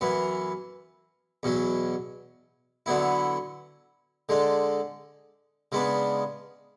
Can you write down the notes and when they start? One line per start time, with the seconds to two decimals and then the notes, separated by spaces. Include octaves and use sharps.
0.01 F#2 E3 B3
1.43 E2 B2 F#3
2.86 D3 F#3 B3 E4
4.29 D3 G#3 D4
5.72 C#3 G#3 B3 D4